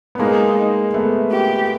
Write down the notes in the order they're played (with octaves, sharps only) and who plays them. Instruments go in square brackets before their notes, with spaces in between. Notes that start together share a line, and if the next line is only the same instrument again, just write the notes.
[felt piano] B3
[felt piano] G#3 A#3 [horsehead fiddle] D#4
[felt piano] A3 B3
[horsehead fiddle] G4